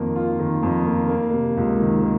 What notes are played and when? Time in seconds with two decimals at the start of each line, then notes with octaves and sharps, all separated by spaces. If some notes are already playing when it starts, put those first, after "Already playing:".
Already playing: F2 D#3 A#3
0.16 F4
0.39 D#3
0.63 F2
0.86 A#3
1.09 A#3
1.33 C3
1.57 C#2
1.80 D#3
2.03 A#3